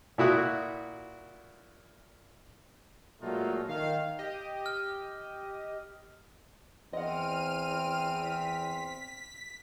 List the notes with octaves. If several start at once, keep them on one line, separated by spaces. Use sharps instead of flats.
A#2 E4 F#4 D#6
A#2 F#3 G#3 A3 D#4 F4
D#3 D#4 F5
G4 D#5
F6
E2 C4 D#5 F#5 F6 D#7
B6